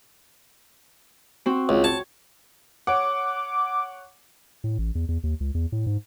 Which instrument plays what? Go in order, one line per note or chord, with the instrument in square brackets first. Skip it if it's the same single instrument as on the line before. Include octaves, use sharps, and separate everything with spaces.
[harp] C4 F#4 C5
[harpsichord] C#2
[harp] C#5 [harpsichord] A5
[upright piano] C#5 F#5 [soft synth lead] D6
[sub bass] A2
A1
E2
E2
D#2
C#2
E2
A2
G#2